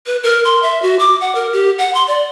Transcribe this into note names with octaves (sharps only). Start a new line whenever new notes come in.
B4
A#4
C6
E5
F#4
D6
F#5
A#4
G4
F#5
C6
D5